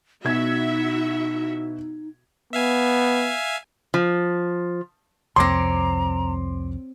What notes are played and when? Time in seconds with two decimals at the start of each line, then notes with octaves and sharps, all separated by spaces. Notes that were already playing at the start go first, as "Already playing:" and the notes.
0.25 B2 D#4 E4 F#4 E5 G#6
2.53 B3 E5 F5 G#5
3.94 F3
5.36 C2 F2 C4 C#5 A#5 C6 D6 A#6